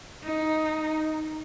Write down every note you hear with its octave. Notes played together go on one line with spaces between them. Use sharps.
D#4